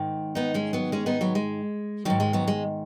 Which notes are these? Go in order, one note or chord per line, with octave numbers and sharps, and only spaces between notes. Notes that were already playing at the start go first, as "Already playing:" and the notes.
Already playing: G#2 D#3
B3 D#4
G#3 C#4
F#3 B3
G#3 C#4
B3 D#4
F#3 B3
G#3
G#2 D#3 F#3
G#3
F#3 B3
G#3